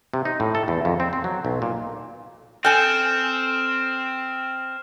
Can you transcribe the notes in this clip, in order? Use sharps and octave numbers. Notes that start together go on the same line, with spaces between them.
C3
D#4
A2
A4
E2
F2
C4
C4
F#3
B1
A#2
C4 A4 G5 G#5 F6 E7